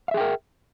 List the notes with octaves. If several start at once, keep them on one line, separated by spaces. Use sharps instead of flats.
G#4 A#4 E5 F5 G5